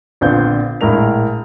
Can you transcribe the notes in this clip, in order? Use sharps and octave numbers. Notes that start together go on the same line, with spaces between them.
A#1 D3 B3 C4 F4 G6
A#1 A2 G#3 A#4 F7